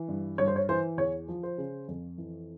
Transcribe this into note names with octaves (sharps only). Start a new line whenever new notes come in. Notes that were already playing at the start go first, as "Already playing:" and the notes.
Already playing: E3
G2
G2 C#5
C5
C#5
E3 C5
E2 C#5
F3
C5
C#3
F2
E3